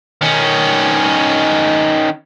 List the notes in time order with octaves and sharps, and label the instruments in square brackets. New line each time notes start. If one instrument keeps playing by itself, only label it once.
[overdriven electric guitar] D#3 C#4